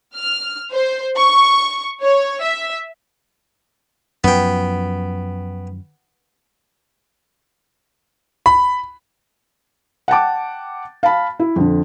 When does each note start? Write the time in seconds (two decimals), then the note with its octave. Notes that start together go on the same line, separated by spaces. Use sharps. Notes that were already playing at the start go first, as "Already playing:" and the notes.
0.16 F6
0.72 C5
1.17 C#6
2.03 C#5
2.44 E5
4.24 F#2 F3 B3 G5
8.46 B5
10.08 F#5 G5 A5 D6
11.03 F5 A5 B5
11.40 E4
11.56 F2 D3